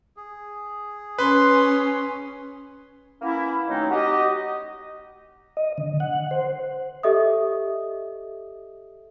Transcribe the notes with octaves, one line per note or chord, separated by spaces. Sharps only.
G#4
C#4 B4 C6
A#3 B3 C#4 E4
D#3 F#3 A3 C4 C#4 D#4
F#4 G4 D#5
D#5
D3
F#5
C5
G4 A4 D#5 E5 D#6